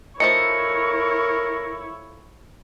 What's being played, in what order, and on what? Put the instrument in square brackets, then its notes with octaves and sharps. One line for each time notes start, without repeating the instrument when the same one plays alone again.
[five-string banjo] F3 A3 D#4 [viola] E4 C#5 [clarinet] A#4 [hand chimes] C#7